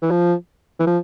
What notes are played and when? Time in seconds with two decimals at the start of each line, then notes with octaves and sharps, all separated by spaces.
0.02 E3
0.11 F3
0.80 E3
0.87 F3